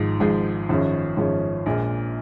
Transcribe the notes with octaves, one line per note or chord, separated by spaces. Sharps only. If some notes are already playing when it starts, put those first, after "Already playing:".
Already playing: G#1 G#2 F3 G#3
G#1 G#2 F3 G#3
G#1 F#2 F3 G#3 C#4
G#1 F#2 F3 G#3 C#4
A#1 A#2 G#3